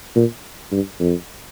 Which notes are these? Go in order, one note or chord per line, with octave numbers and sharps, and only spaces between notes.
A#2
G2
F2